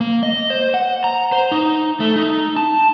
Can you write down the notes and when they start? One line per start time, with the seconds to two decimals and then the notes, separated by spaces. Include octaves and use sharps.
0.01 A#3
0.23 D#5
0.50 C5
0.74 F#5
1.04 A#5
1.32 C5
1.52 D#4
2.00 A3
2.16 D#4
2.57 A5